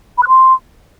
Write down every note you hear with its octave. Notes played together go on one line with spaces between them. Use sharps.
B5
F#6
C6